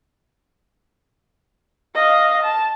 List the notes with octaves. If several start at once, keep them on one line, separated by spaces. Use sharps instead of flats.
D#5 F5
A5